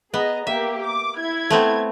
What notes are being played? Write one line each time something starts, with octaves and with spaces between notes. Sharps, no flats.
B3 G#4 D#5 A#5
A#3 G4 E5
D6
E4 G#6
A3 B3 C4